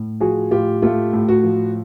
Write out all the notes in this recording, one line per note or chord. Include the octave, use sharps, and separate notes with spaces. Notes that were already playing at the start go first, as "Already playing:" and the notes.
Already playing: A2
F3 F#4 G#4
A2 F4 G4
A3 F4 G4
A2
F#4
F3